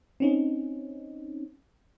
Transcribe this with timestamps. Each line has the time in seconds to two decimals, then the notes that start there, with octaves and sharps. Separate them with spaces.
0.20 C4 C#4 D#4